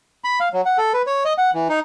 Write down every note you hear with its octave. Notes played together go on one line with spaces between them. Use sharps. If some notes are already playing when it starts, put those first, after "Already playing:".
B5
F5
F#3
F#5
A4
B4
C#5
D#5
F#5
E3
D#4